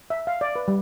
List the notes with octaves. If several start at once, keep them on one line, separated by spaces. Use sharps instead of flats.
E5
F5
D5
B4
G3